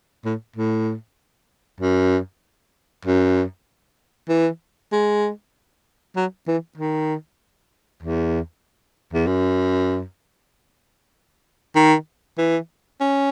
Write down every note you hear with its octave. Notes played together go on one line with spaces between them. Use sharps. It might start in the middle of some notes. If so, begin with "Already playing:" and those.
A2
A2
F#2
F#2
E3
G#3
F#3
E3
D#3
E2
E2
F#2
D#3
E3
C#4